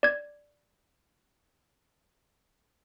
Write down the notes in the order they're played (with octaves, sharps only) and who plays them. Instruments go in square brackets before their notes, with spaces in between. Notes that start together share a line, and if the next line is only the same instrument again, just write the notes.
[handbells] D5 G#6